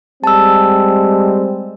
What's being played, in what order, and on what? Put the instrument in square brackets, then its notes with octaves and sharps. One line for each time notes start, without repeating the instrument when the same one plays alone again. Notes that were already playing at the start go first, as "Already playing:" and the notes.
[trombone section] G3 G#3 C4 [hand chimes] A5 E6